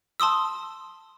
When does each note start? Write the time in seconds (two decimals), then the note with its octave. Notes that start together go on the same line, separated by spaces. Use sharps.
0.20 A5 C6 D#6 E6